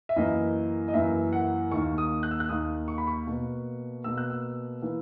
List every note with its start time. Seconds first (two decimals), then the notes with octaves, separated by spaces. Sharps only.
0.09 E5
0.16 F#2 E3 A#3 D#5
0.88 D#5
0.94 F#2 E3 A#3 E5
1.33 F#5
1.71 D#2 D#3 A#3 C#6
1.98 D#6
2.23 F#6
2.31 E6
2.40 F#6
2.49 D#2 D#3 A#3 D#6
2.88 C#6
2.98 B5
3.07 C#6
3.27 B2 A#3
4.04 B2 A#3 E6
4.18 F#6
4.30 E6
4.82 E3 A#3